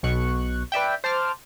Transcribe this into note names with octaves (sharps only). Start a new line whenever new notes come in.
B1 B2 C#6 F#6
B4 D5 E5 G5
C5 A5 D6 F6